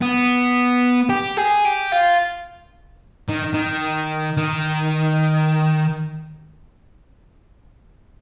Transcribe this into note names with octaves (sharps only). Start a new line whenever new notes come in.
B3
G4
G#4
G4
F4
D#3
D#3
D#3